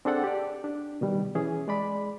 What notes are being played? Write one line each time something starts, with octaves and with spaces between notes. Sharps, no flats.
C4 D4 G#4 A4 F#5 G5
G4 D5
D4
B2 D#3 G3
E3 C#4 G#4
G#3 D5 B5